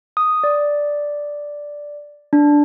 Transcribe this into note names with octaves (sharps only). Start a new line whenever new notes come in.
D#6
D5
D4